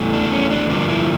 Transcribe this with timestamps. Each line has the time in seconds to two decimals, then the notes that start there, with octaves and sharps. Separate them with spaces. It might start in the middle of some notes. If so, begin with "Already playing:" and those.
Already playing: E2 E3 A3
0.13 D4
0.32 C#4
0.50 D4
0.70 G2 D3 F3 A#3 D4
0.88 E4